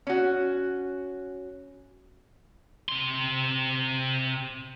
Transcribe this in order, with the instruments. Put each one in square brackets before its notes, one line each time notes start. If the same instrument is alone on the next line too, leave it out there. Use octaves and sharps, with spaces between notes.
[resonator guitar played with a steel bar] C#4 F#4
[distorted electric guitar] C3 C6